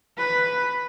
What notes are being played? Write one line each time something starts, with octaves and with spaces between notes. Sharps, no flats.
B4